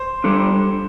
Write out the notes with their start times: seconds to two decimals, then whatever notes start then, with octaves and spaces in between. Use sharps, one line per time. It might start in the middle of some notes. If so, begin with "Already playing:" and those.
Already playing: C5
0.24 G3 D4 A4